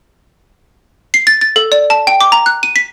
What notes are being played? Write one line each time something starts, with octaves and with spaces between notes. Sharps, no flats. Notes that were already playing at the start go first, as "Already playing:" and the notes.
C7
A6
A6
A4
D5
A5
G5
D6
A#5
F#6
D#7
B6